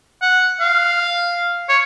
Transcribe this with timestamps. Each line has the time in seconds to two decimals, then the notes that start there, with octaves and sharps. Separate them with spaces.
0.22 F#5
0.61 F5
1.69 C#5